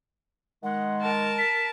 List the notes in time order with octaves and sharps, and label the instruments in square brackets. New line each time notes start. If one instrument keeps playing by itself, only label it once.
[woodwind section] D#3 G#3 [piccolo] F#5
[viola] A#4 A5
[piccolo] B6